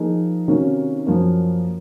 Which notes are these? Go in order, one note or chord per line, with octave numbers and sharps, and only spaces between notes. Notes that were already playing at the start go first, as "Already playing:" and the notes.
Already playing: F3 A#3 D#4 G#4
C3 D#3 A#3 C#4 F#4
F#2 F3 A#3 C#4